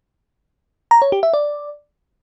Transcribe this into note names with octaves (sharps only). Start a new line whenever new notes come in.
A#5
C#5
G4
E5
D5